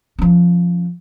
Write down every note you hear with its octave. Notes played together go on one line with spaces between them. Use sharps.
F3 C#4